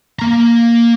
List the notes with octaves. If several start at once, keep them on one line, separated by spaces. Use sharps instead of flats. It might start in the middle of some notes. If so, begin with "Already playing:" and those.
A#3 A#5